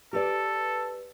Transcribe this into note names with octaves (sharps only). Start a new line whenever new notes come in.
G4 A4 B4 D5